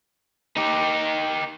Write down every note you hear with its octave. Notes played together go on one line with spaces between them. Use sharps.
D#4 G4